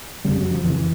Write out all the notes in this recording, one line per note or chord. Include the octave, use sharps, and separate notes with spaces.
F2 C#3 G3
F#3
F3
F2 C#3 E3